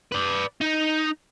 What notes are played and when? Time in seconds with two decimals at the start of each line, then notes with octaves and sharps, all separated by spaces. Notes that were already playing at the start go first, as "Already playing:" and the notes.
0.12 B4 D5
0.61 D#4